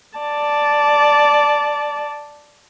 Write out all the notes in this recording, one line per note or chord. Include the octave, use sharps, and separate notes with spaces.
D5 A5